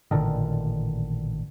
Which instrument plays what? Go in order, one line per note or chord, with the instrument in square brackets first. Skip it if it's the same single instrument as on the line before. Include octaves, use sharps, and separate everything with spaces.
[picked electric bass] A1 A#2 D3 D#3